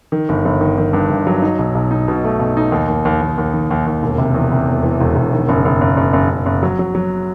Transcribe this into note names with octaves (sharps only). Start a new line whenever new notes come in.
D#3
G1
G1
D#3
D#3
G2
G1
F#3
D#4
B1
B1
D#4
B2
A3
B1
D#4
D#2
D#2
D#2
D#2
D#2
D#3
D#2
D#2
E1
C3
E2
C3
E1
E3
E1
E1
D#3
F#1
F#1
F#1
F#1
F#1
F#1
F#1
F#3
F#3
F#3